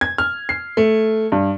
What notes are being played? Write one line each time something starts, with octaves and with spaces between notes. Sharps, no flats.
G#6
F6
C7
A3
G2